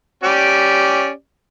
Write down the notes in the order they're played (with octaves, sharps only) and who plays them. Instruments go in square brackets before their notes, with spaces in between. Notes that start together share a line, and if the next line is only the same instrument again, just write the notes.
[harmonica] C#4 G4 D5